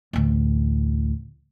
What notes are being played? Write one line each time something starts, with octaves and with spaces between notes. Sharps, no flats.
A1 D2